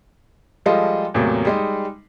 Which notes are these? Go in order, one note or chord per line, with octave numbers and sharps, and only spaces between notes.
F3 G3 G#3 F4 A4 D#5
E2 A2 C3 F#3 A#3
G3 G#3 D#4